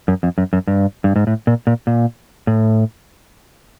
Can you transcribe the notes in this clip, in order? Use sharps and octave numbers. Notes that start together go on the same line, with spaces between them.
F#2
F2
F#2
F#2
G2
G2
G#2
A2
A#2
A#2
A#2
A2